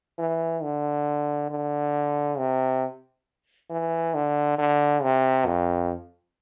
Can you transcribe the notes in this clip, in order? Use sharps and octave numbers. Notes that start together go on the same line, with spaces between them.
E3
D3
D3
C3
E3
D3
D3
C3
F2